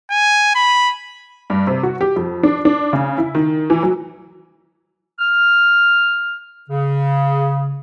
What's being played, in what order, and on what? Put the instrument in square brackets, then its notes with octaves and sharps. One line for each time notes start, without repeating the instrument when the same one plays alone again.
[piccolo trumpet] G#5
B5
[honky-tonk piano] G2
C3
F#4
G4
F2
D4
D4
C#3
E4
D#3
E3
F#3
[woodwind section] F6
C#3